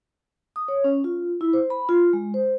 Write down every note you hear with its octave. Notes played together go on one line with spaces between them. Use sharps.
D#6
C#5
C#4
F4
E4
C5
B5
F4
G#3
C5